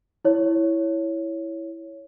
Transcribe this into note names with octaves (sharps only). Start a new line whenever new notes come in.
E4 C#5